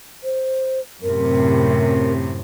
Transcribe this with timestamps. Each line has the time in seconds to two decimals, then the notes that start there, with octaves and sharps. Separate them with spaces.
0.24 C5
1.03 F#2 A2 C3 A#4